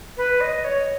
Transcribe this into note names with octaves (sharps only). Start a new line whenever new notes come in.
B4
D#5
C#5